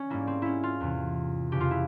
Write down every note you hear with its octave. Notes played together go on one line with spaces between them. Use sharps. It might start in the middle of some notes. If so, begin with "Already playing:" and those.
Already playing: C#4
G#2 G3 A#3 E4
C4
C#4 E4
F4
E2 C3 E3
F2 C#3 E3 G4
F4
E4